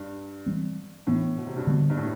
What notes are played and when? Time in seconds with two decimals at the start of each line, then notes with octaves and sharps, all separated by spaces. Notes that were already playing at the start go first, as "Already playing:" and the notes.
Already playing: G2
0.46 E3 G3 C4
1.07 A2 E3 B3 D4
1.37 B2
1.46 C3
1.56 G2 B2
1.67 D3 G3 B3
1.90 G2
1.97 A2